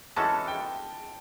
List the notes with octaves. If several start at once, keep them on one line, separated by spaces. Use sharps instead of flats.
E3 G#3 C#4 F#4 A4 A5
G5